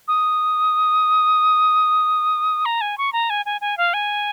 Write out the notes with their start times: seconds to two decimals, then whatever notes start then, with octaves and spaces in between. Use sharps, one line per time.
0.08 D#6
2.65 A#5
2.81 G#5
2.98 C#6
3.13 A#5
3.30 G#5
3.46 G#5
3.61 G#5
3.77 F5
3.94 G#5